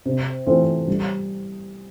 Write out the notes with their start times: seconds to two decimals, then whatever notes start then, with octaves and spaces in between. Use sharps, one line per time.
0.06 C3
0.46 E3 A3 C4 F4
0.88 G3